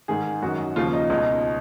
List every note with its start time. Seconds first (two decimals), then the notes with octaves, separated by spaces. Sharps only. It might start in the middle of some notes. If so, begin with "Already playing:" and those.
0.08 G#2 D#3 G#4
0.42 F#2 D#3 F#4
0.76 D#2 C#3 F3 F4
0.93 D#4
1.10 C#2 B2 D#4